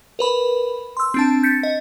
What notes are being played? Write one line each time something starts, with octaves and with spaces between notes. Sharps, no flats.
A#4 B4 B5
C6 E6
C4 D4 A5
G6 A6 B6 C#7
D#5